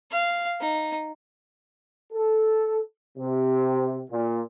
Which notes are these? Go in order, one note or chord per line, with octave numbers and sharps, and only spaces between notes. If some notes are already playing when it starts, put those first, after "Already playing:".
F5
D#4
A4
C3
A#2